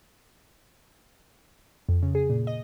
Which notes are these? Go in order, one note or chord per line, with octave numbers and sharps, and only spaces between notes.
F2
C#3
G#4
A#2
D#5